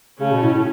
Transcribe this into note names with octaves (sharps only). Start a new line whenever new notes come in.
C#3 A3 C#4
B2
A2
A2